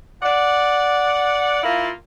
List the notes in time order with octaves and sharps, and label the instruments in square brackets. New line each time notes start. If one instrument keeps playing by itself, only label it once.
[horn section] D5 F#5
A#3 E4 F4